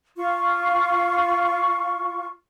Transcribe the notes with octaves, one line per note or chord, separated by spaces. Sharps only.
F4 C#6